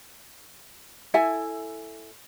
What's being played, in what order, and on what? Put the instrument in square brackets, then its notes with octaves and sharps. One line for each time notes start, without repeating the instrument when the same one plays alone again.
[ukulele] E4 A4 E5 G#5